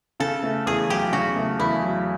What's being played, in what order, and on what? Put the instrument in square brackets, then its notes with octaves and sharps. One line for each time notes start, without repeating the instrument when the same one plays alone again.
[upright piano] C#3 [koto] A4
[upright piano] A3
[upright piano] E2 [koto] G#4
[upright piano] F#3 [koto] G4
[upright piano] C#3 [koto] F#4
[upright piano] A3
[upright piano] E2 [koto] E4
[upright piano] F#3